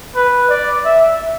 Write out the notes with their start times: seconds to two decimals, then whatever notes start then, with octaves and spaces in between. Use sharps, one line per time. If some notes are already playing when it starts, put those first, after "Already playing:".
0.16 B4
0.50 D5
0.85 E5